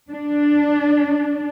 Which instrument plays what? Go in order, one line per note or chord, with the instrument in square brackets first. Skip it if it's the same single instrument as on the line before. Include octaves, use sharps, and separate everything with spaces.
[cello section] D4